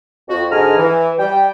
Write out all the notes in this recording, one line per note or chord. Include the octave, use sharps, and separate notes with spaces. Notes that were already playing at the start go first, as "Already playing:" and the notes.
F2 F#4
G#2 D3 G#3 G#5 A#5 F6
E3
G3 G5